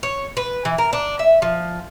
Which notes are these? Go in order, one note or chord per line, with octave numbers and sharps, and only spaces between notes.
C#5
B4
E3
A#4
D4
E5
F3